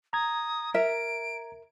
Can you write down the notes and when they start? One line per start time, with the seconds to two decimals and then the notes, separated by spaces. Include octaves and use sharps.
0.13 A#5 D#6 G#6
0.74 A#4 E5 D7